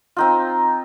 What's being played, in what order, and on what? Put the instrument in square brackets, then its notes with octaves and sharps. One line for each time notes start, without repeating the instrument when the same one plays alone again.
[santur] C4 D#4 F4